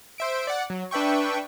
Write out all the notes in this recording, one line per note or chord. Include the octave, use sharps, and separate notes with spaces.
C5 E5 D7
D5 F#5
F#3
D4 B4 E5 G5 C#6